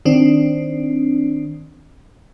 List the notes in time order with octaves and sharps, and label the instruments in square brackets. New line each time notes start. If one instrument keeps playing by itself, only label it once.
[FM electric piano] D#3 C4 D4